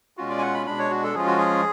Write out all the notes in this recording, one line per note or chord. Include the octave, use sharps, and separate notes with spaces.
B2 G#3 C#4 F4 F#4
D5
G#5
F#5
B5
B2 G#3 D4 B5
C#5
F#4
A4
F3 G#3 C#4 F4 G#4
F#4
G#4